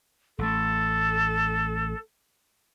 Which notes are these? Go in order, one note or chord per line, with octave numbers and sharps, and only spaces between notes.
A1 A3 A4